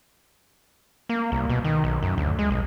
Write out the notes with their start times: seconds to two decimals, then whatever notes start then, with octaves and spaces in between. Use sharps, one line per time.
1.09 A#3
1.32 C2
1.50 B2
1.64 D#3
1.84 B1
2.03 F#2
2.18 D2
2.39 G#3
2.51 B1